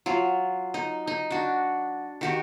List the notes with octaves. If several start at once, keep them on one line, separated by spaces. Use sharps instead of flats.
F#3 F4
D#4
D#4
D4 F#4
D#3 F#4 G4